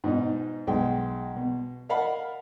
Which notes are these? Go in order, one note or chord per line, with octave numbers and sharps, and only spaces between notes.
G#2 B2 D#4
B1 B2 G#3 G5
B2
A#4 D#5 F5 F#5 A5 B5